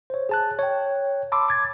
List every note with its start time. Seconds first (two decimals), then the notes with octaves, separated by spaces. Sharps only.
0.10 C5 C#5
0.29 G#4 A5 F#6
0.59 C#5 G5
1.32 A5 B5 C6 D6 E6
1.48 D6 G#6 A6